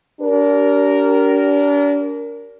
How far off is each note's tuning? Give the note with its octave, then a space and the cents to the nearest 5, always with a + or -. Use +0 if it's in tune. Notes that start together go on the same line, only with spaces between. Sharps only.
D4 -35 G4 -30 A#4 +0